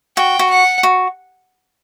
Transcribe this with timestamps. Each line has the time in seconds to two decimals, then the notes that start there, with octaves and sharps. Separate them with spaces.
0.17 F#4 G5
0.39 F#4
0.50 F#5
0.83 F#4